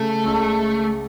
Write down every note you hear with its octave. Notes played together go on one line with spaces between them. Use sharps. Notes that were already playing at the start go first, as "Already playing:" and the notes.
Already playing: C#3 A3
C#2 C#3 G#3